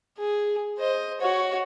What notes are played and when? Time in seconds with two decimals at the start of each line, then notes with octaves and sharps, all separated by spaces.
0.19 G#4
0.79 C5 D#5
1.21 F#4 C#5